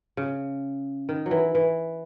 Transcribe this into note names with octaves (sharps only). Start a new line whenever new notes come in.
C#3
D#3
F#3
E3
E3